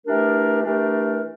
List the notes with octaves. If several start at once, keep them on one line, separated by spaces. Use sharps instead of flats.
E3 A3 D4 G4 A#4
E3 A3 D4 G4 A#4